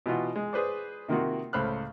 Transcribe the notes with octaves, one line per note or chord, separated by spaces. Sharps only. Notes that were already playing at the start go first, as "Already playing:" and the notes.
B2 E3 F4 F#4
G#3
G#4 B4 C5 D5
C3 D#3 A#3 F4 F#4
C#2 A2 C5 B5 F6 F#6